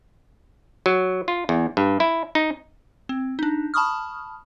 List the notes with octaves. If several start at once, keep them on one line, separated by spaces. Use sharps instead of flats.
F#3
F4
E2
G2
E4
D#4
C4
D4 D#4
A5 B5 C#6 D#6 F6